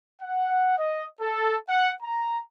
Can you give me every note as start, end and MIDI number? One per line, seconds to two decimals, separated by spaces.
0.21 0.76 78
0.78 1.06 75
1.21 1.57 69
1.68 1.91 78
2.03 2.39 82